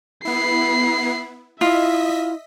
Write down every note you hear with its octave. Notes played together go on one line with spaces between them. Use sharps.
B3 E4 B5 C7
E4 F4 D#5 E5 B6